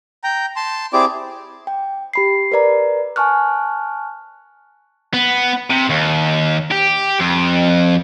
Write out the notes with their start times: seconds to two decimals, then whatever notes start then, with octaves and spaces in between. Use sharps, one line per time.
0.24 G5 A#5
0.56 A5 C6
0.93 C4 E4 G4 G#4 D5 D6
1.67 G5
2.14 G4 B5 C7
2.52 A#4 B4 D5 A#5
3.16 G#5 A5 C#6 F6 F#6
5.14 B3
5.70 C3
5.90 D#2
6.71 G4
7.20 F2